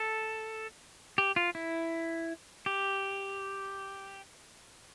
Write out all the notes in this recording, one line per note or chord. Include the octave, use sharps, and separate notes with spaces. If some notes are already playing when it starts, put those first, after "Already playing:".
Already playing: A4
G4
F4
E4
G4